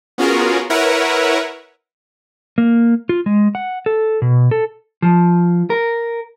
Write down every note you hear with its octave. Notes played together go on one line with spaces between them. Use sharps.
B3 C#4 F4 F#4 G#4 A#4
E4 A#4 B4 C#5 E5 F#5
A#3
F4
G#3
F#5
A4
B2
A4
F3
A#4